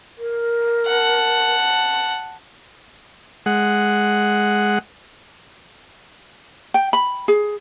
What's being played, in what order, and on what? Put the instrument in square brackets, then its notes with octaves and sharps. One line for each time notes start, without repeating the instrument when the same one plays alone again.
[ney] A#4
[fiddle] F#5 A5
[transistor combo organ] G#3 F#5
[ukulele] G5
B5
G#4